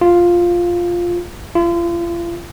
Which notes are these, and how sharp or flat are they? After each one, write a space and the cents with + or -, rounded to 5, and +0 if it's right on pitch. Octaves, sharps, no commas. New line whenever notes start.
F4 +0
F4 -40